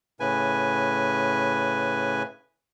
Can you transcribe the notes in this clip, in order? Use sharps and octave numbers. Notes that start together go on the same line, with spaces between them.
A2 C#3 B4 G#5